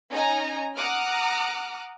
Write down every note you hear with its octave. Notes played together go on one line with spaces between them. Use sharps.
C#4 D#4 D#5 G#5 A#5
F#5 A#5 D6 D#6 F6 F#6